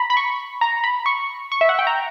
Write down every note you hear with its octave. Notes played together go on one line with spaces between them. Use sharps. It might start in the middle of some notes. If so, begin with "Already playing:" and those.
Already playing: A#5 B5
B5
C#6
A#5
B5
C#6
C#6
E5
F#5
G5
A#5